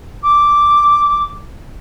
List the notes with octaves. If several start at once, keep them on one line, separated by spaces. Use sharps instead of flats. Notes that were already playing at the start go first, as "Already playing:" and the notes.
D6